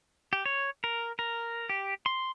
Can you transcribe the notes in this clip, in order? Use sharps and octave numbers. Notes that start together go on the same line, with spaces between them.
G4
C#5
A#4
A#4
G4
C6